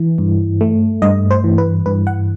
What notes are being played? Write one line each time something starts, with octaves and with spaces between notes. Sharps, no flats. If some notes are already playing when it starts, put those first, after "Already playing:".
Already playing: E3
G2
A3
G2 D#5
C5
E3
B4
G2 B4
F#5